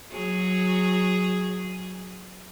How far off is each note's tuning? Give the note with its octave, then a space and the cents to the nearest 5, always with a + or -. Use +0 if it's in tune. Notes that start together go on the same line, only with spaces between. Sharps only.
F#3 -10 G#4 +0